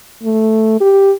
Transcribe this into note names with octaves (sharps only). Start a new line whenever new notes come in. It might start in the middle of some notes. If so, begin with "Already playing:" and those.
A3
G4